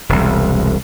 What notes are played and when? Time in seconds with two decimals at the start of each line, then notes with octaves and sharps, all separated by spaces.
0.09 E1 C2